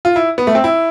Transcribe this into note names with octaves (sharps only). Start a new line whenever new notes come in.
F4
E4
B3
A3
C4
E4